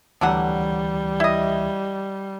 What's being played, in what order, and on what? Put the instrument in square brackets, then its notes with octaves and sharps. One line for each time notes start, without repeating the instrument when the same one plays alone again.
[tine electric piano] D2 E3 [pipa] D3 F#3 F#5 [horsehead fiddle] G3
[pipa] E4 D#5